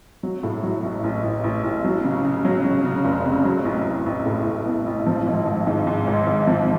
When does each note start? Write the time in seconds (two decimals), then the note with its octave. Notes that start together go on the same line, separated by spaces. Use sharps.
0.23 F#3
0.43 A2
0.63 F#3
0.83 A1
1.04 A1
1.23 A1
1.44 A1
1.64 A1
1.85 F#3
2.04 C#3
2.25 C#3
2.45 F#3
2.65 F#3
2.85 C#3
3.05 F1
3.25 F2
3.45 F#3
3.65 A1
3.85 A1
4.06 A1
4.26 A2
4.46 A2
4.66 B3
4.86 A1
5.07 F3
5.26 G#1
5.47 G#1
5.67 G#2
5.87 G#2
6.07 G#1
6.27 G#1
6.47 F3